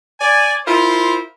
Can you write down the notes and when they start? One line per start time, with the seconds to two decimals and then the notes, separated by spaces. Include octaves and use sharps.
0.21 D5 G#5
0.66 E4 F4 A#4 C5